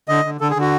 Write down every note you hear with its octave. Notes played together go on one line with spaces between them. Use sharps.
D3 D#5
D3
D3 A4
G#4
D3 F#4